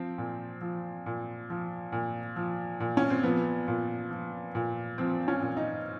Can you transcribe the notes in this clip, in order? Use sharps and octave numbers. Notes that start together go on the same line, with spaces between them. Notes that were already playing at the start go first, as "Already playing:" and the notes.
Already playing: F3 C4
A#2
F3
A#2
F3
A#2
F3
A#2
C#4
C4
F3 B3
A#2
F3
A#2
F3 C4
C#4
A#2
D#4